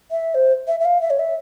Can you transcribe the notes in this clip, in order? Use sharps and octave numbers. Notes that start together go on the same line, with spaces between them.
E5
C5
E5
E5
F5
E5
C#5
E5